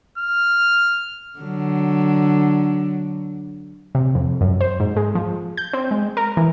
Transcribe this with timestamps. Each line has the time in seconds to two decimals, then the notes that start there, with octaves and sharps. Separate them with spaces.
0.18 F6
1.39 D3 F#3
3.95 C3
4.15 F2
4.41 F#2
4.61 C5
4.80 G#2
4.97 G#3
5.15 F3
5.57 G6
5.73 C4
5.91 G#3
6.17 A#4
6.37 E3